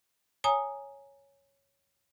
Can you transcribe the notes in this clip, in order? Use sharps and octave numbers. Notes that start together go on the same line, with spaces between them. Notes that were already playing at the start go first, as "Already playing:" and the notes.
C#5 G#5 A#5 D#6